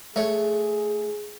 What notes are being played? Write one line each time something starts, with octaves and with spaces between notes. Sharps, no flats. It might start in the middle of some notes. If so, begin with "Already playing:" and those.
A3 G#4 C#5